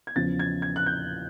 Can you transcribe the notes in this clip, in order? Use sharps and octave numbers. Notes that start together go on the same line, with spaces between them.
G#6
E2 C#3 F3 A6
G#6
G#6
F#6
G6